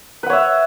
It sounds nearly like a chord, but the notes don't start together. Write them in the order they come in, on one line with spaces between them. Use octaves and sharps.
B4 F#5 C#5 E5